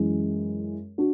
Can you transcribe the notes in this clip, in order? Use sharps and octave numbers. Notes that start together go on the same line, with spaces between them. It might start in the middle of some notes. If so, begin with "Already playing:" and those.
Already playing: F#2 E3 G#3
D4 F#4